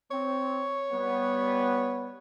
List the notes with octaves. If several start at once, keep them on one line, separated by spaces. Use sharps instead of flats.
C4 C#5
G3 B3